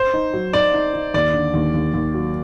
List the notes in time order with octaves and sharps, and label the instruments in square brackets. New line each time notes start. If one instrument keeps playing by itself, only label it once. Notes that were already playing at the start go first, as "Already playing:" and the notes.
Already playing: [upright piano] C5
[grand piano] D#4
F#3
[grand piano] D#4 [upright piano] D5
[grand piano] D#4
D#4
[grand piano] D#2 [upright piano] D5
[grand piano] D3
D#2
D#2
D#2
F#3